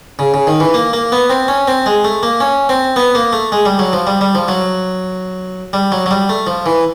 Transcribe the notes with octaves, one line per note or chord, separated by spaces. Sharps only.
C#3
C#3
D#3
E3
A#3
A#3
B3
C4
C#4
C4
G#3
A3
A#3
C#4
C4
B3
A#3
A3
G#3
G3
F#3
F3
G3
G3
F3
F#3
G3
F#3
F#3
G3
A3
F3
E3